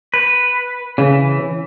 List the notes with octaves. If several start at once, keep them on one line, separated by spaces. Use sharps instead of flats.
B4
C#3 E3